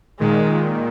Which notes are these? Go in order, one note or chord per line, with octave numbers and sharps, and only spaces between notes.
A#2 D#3 G#3